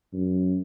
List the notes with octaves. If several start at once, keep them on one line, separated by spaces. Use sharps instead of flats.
F#2